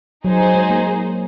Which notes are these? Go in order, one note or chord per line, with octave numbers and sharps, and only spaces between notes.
F#3 D#4 G#4 C5
F#3
G#3
A#3